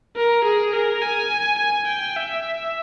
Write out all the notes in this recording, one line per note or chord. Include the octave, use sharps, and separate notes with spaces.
A#4
G#4
A#4
G#5
G#5
G5
E5